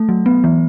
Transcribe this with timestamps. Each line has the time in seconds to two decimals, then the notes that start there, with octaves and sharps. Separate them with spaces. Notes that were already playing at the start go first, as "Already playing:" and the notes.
Already playing: A3
0.09 F#3
0.26 B3
0.44 E3